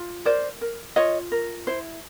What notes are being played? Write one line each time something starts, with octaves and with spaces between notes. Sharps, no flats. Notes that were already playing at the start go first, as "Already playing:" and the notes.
Already playing: F4
A#4 C5 D5
A#4
F4 C#5 D#5
A#4
E4 C5